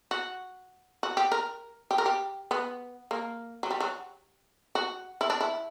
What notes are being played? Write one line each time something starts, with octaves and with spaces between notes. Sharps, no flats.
F#4
F#4
G4
A#4
G4
A#4
G4
B3
A#3
F#3
G3
F#3
F#4
E4
D4
E4